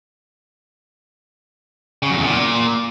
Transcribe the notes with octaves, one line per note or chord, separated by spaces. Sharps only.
C#3
F#2
E2
A#2